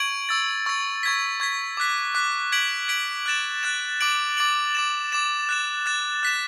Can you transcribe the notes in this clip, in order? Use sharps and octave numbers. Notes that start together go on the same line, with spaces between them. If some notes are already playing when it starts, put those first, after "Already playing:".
Already playing: C#6 G#6 D7 F#7
C#6 E6 A6
C#6 E6 A6
C#6 G#6 B6
C#6 G#6 B6
D6 F#6 B6
D6 F#6 B6
G#6 B6 D7 F#7
G#6 B6 D7 F#7
F#6 A6 E7
F#6 A6 E7
D6 A6 D7 F#7
D6 A6 D7 F#7
D6 A6 E7
D6 A6 E7
F#6 A6 E7
F#6 A6 E7
F#6 B6 E7